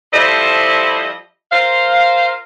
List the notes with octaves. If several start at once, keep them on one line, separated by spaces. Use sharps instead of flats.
F3 G3 E4 A4 C5 D#5
F4 A#4 C5 F5